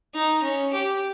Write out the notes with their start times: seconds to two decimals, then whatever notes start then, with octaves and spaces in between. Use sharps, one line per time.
0.15 D#4
0.43 C#4
0.73 G4